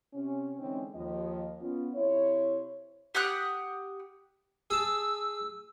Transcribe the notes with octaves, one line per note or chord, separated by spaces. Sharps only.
C3 C#4
D3 E3 G#3 C4 C#4 D#4
D#2 F3 D#5
B3 C#4 F4
C3 E4 C5 C#5
G4 F#5 D#6 F#6
G#4 A5 E6